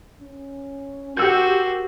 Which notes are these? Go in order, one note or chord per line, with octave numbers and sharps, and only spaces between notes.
C#4
F#4 G4 A#4 C5 E6 G6